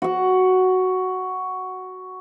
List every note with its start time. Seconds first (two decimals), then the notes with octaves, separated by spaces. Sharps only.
0.02 F#4 F#5